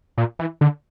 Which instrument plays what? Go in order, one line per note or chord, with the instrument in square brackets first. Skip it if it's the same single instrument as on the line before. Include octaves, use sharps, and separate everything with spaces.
[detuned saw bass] A#2
E3
D3